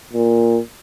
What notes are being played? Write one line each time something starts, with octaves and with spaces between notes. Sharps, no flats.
A#2